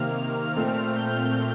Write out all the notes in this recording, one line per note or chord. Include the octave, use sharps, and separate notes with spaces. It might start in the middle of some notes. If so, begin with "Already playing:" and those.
Already playing: C3 D#3 A#3 F6
A#2 A3 C4 F6
G6